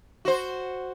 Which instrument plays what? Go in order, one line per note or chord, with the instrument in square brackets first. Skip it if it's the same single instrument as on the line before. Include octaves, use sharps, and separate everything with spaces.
[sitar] F#4 C5